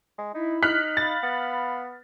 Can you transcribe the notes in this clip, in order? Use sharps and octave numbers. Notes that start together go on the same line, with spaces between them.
G#3
D#4 E4
D#4 F6 F#6 B6
F5 B5 A6
B3